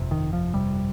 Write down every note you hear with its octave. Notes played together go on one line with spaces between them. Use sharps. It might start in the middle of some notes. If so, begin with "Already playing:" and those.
Already playing: G1 F2 C3
D#3
F3
G1 F2 C3 G3